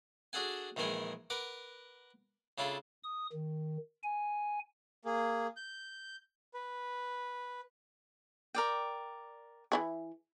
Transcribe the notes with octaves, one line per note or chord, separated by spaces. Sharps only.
D4 F#4 G#4 A4 F#5 G#5
A#1 D#3 E3 G#3 A#4 G#5
A#4 B4 F#5 D6
C#3 D4 E4 F4 A4
D#6
D#3
G#5
A#3 G#4
G6
B4
A#4 D5 G5
E3 E4 G#4